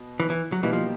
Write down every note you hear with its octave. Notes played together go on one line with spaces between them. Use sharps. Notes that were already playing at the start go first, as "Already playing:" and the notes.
Already playing: B2
E3
E3
F#3
B2 E3 G3 A#3 D#4 G4
F3